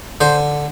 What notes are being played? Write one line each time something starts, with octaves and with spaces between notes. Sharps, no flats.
D3 C5